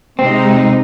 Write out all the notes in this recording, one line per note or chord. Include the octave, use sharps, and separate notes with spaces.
C3 G#3 C4 D#4